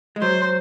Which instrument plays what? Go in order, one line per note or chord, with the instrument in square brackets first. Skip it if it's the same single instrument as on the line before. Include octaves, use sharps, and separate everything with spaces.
[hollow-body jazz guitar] G#3
[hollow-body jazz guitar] F#3 [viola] C5